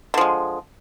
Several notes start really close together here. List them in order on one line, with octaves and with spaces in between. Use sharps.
D3 F3 G#3